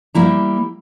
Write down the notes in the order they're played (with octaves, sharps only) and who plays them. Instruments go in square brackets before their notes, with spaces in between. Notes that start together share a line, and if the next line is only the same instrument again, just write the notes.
[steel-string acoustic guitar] G3 A#3 E4 A#5